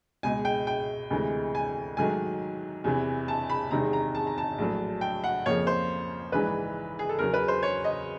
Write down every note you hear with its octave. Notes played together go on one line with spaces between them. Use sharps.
C#2 B2 G#3 G#5
G5
G5
D2 C3 E3 G#3
G#5
G#2 D#3 F#3 A3 G#5
E2 C3 E3
A5
B5
E2 C3 D#3 G#3 C4 A#5
A#5
A5
A#5
A5
A#1 A2 F#3
G5
F#5
F2 C#3 F3 A#3 C#5
C5
A#1 G#2 E3 B4
G#4
A4
E2 C#3 F#3 A#4
B4
C5
C#5
D#5